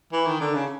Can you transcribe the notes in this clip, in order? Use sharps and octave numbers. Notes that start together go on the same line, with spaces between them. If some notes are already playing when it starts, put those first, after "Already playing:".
E3
D#3
D3
C#3